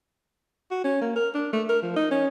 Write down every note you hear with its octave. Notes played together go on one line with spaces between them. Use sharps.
F#4
C#4
A#3
A#4
D4
A3
A#4
F3
D#4
C#4